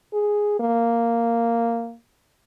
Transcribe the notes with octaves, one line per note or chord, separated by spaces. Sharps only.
G#4
A#3